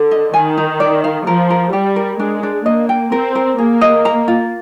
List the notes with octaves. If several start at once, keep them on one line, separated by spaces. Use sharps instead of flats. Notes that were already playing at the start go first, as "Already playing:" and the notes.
Already playing: D3
D#5
D#3 G#5
D#4
D5
F5
F3 A#4
A#4
G3 G4
A#4
G#3 D4
D4
A#3 D#5
G5
C4 A#4
A#4
A#3 G#4
D#5
A#5
F4